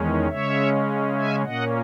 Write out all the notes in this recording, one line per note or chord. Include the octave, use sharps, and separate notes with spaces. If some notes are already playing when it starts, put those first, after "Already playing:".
Already playing: E2 D#3 G#3 C#4
C#3 G#3 C#4 C#5 E5
E5 G#5
A#2 A#3 C#4 D#5 F#5